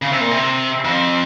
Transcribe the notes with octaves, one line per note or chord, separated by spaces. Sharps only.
C#3
C3
A#2
C3
F2